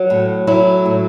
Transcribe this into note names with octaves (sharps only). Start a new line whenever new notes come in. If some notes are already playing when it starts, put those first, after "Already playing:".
Already playing: F#3
A2
F#3 E4
A2